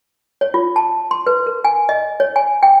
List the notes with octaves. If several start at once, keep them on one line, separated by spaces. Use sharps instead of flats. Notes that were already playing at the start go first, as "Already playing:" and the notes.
C#5
F4
A5
C6
B4
A#4
G#5
D#5
C#5
G#5
G5